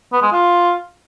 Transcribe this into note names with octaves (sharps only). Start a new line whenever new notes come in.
B3
G#3
F4